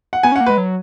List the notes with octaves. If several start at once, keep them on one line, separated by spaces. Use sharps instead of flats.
F#5
B3 G#5
C#4 F#5
A#3
B4
G#3
F#3